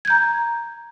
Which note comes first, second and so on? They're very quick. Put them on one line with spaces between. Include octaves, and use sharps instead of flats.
G#6 G6 A#5